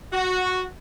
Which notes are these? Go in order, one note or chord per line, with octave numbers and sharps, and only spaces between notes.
F#4